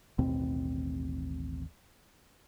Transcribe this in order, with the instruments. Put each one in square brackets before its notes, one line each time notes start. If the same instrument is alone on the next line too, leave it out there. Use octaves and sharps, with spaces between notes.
[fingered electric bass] A1 D#2 B2 C4